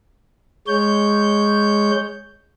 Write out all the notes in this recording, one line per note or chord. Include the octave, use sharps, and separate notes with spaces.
G#3 C#5 G6